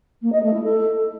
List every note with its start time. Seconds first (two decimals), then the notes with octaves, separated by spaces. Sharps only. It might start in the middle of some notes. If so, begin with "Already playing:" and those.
0.22 A#3
0.32 D#5
0.43 A3
0.53 E4
0.64 A4